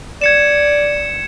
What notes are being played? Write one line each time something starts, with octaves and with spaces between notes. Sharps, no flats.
D5 G#6 C#7 E7